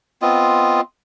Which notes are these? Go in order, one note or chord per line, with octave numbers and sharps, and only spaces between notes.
B3 C4 F4 D#5